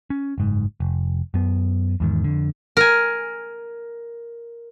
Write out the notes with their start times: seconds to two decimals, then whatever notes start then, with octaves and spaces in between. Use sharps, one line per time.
0.10 C#4
0.38 F#1 G#2
0.80 F1
1.34 F#2 B3
2.00 E2 G#2 D#3
2.24 F2 D3
2.77 A#4 G#5